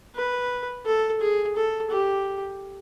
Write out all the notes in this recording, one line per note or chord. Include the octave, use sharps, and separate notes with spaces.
B4
A4
G#4
A4
G4